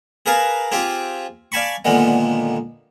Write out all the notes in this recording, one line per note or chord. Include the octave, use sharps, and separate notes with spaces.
G#4 A#4 B4 F5 G#5 A5
C4 F4 G4 G#4
D5 F5 G#5 A5 B5 C#6
A#2 D3 D#3 G#3 B3